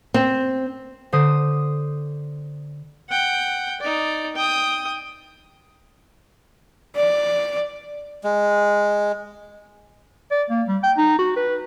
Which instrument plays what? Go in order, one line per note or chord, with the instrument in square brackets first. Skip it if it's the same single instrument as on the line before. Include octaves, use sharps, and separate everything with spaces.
[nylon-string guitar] C4
[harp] D3 C5 D#6
[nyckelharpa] F#5 G5
D#4 D5
G5 D#6
[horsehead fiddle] D5
[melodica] G#3
[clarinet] D5
A#3
G3
G5
D#4
F#4
B4